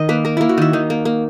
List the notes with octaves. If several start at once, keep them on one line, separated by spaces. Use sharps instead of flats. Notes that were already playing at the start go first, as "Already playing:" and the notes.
Already playing: D#3 D#5
A#3 B4
A#3 A#4
A#3 E4
F#4
D#3 E4
D#3 D#4
A#3
A#3